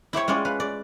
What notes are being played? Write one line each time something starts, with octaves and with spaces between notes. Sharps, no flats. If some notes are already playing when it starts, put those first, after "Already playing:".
E4 G4 C5 C#5
G#3 C#4 F4 C#5 D5
B4 F5
D5